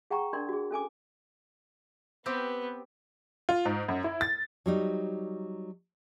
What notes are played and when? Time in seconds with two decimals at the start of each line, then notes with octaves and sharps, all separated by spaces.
0.11 G#4 F#5 G5 A#5 C#6
0.33 D4 A#4 D5 C6
0.49 F#4 G#4
0.71 C#4 A4 G#5 D6
2.26 B3 C4 G4 B4
3.49 F4
3.65 G#2
3.88 F#2
4.04 E4
4.21 A6
4.66 F#3 G3 D#4